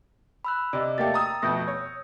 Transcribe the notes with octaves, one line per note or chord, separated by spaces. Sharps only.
B5 E6 F#6
C3 D5 D#5
A3 A#3 G4 G5 A6
A#5 D#6 E6
F2 B2 A3 G6 A#6
C#5